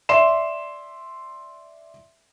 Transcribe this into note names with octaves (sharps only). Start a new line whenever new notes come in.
D5 E5 C6 C7 E7